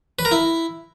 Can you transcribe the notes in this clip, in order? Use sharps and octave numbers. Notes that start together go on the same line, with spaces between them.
B4
A#4
E4